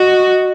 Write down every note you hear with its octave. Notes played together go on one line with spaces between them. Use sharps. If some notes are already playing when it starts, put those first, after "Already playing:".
Already playing: F#4 D#5